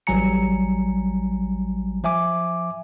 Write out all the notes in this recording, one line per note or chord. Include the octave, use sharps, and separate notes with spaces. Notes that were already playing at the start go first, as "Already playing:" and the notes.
A1 F#3 G3 G#5 A#5 C#7
F3 E5 G#5 D6